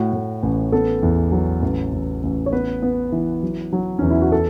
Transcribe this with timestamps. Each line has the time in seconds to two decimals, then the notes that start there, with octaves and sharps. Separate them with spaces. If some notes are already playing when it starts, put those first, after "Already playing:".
Already playing: A2 F#4
0.13 A2
0.43 A1
0.72 B3 A4
1.03 E2
1.32 F#3
1.62 A1
1.93 A1
2.23 A1
2.46 C#5
2.53 B3 B4
2.82 B3
3.12 E3
3.43 F#3
3.73 F#3
3.99 E2 C#4
4.11 E4
4.22 F#4
4.32 A4